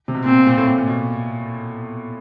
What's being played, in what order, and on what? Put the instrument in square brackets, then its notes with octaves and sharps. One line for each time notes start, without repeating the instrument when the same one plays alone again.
[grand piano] C3
B2
[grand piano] A#2 [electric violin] C4
[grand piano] A#2
A2
A#2
A#2
B2